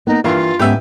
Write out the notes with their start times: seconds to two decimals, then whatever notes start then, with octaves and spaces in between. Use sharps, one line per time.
0.07 A#3 B3 D#4
0.24 G2 E3 A#3 F4 E5
0.59 G#2 B3 C#4 G4 B4 E5